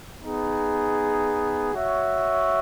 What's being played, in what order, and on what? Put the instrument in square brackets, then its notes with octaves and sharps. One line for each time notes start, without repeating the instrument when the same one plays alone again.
[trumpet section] B3 D#4 G#4
F#4 C#5 E5